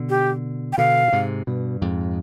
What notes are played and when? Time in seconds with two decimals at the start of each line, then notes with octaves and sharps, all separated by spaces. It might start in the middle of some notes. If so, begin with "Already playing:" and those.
Already playing: B2 D3
0.09 G4
0.72 G5
0.78 B2 D3 F5
1.08 D3
1.12 G#2 C3
1.47 G2 B2
1.82 F2 G#2